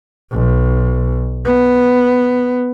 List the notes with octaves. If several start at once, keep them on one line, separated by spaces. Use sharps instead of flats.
B1
B3